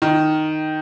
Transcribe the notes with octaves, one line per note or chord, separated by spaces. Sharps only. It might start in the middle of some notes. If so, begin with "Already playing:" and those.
D#3